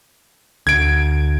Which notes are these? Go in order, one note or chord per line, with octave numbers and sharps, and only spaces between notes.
D2 G#6 D7